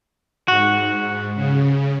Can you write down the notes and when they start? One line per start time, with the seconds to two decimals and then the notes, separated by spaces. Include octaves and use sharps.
0.48 G#2 F#4
1.35 C#3